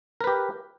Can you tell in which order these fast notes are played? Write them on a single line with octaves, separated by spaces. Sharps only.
A#4 B4 G4